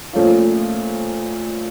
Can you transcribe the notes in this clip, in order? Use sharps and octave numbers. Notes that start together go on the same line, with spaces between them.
A#2 F3 A3 C#4 F4